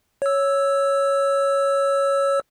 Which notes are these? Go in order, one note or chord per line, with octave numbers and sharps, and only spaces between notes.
C#5 E6